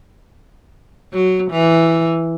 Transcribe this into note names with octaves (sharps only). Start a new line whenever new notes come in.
F#3
E3